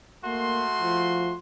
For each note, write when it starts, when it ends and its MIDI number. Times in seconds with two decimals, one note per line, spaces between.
0.24 1.36 57
0.24 0.65 58
0.24 1.36 66
0.24 1.36 84
0.81 1.36 53